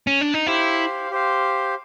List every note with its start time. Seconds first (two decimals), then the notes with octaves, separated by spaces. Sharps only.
0.07 C#4
0.21 D4
0.34 D#4
0.47 E4 G4 C5 F5
1.11 G4 C5 F5